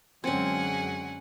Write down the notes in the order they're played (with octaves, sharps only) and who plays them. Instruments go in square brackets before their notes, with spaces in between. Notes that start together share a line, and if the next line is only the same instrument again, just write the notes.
[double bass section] F#2 F#3 G#3 [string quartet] D3 F#5 G#5 [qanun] C4 C#4